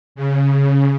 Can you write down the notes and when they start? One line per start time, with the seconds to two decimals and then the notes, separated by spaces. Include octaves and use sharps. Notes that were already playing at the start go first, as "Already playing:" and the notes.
0.15 C#3